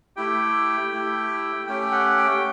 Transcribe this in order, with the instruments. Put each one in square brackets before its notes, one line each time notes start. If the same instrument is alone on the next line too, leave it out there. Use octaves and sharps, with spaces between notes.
[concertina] A3 E4 G4 G5
A3 E4 G4
A3 C#4 G4 G5
F#5
G5